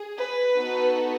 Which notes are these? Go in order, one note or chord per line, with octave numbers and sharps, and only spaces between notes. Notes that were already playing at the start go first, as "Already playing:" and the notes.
Already playing: G#4
B4
B3 D#4 F#4 A4